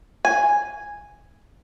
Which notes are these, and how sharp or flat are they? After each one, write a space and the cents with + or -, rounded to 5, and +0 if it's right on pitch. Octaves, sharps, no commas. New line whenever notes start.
G#5 -5